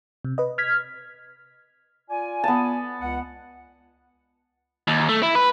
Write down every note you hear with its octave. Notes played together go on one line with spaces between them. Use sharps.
C3
B4 D#5
F6 G#6 B6
F4 D5 G#5
B3 A5
C#2 F#5
D#2
A3
E4
B4